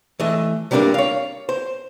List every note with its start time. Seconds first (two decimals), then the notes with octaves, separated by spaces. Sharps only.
0.20 E3 A3 D#5 E5
0.71 C3 G3 A#3 C#4 D4 A#4
0.94 C#5 F5
1.49 C5